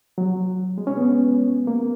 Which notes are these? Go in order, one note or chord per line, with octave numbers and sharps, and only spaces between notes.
F#3
G#3
C#4
B3
A#3